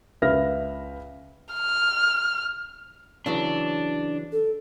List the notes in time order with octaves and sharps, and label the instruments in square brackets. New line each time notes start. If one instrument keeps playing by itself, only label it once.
[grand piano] C#2 B4 E5 F5 F6 A#6
[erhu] F6
[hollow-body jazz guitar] C#3 E3 F#3 [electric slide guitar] D4
[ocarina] A4